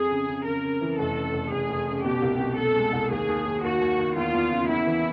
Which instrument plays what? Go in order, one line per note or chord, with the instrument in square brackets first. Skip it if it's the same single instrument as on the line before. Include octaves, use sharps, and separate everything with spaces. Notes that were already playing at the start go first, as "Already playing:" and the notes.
Already playing: [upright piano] F2 [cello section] G#4
[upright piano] C#3
C#3
[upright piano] C#3 [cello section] A#4
[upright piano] C#3
E3
[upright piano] F1 [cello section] A4
[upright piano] C#3
F1
[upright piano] F1 [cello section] G#4
[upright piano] F1
C#3
[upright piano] B2 [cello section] G4
[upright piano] C2
B2
[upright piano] B2 [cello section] A4
[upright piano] G#3
C2
[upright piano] D#2 [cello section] G#4
[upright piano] D#2
D#2
[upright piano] D#2 [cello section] F#4
[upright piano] D#2
D#2
[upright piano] E2 [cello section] F4
[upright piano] E2
C#3
[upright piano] E2 [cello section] E4
[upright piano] E3